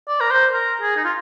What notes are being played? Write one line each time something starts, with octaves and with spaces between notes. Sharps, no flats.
D5
A#4
C5
A#4
G#4
D#4
F4